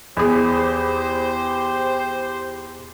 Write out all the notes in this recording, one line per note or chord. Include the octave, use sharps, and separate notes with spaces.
E2 G4 G#4 C5